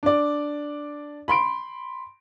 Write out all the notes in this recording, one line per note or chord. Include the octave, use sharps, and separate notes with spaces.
D4 D5
B5 C6 D7